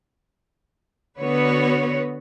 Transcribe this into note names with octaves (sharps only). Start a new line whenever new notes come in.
D3 B3 F#4 B4 C#5